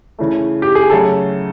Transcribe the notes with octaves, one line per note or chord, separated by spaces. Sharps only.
C#3 E3 A3
G4
G#4
C#3 F#3 A3 A4